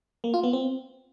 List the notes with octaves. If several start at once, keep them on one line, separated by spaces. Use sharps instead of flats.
A#3
F4
B3
C4